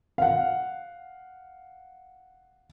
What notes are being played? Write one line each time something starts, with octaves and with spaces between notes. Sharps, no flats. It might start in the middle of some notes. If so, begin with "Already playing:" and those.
F5 F#5